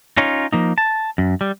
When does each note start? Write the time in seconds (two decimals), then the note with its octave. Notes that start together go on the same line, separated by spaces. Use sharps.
0.17 C#4 D#4 F4 C#5
0.52 F3 A#3 D#4
0.78 A5
1.18 F#2
1.41 G3